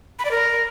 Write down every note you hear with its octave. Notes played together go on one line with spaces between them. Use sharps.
B5
D5
A#4